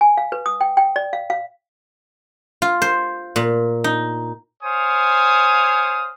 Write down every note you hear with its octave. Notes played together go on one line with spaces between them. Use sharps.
G#5
F5
B4
D#6
G5
G5
D5
F5
F5
F4
C5
A#2
D#4
C5 C#5 F5 G#5 D#6